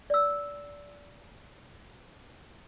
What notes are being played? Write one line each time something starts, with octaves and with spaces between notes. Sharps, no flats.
D5 E6